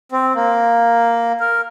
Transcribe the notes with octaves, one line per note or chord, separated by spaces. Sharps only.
C4
A#3
A#4